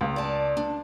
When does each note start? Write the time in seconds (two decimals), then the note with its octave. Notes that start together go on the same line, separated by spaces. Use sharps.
0.01 C#2
0.16 D5 A5
0.57 D4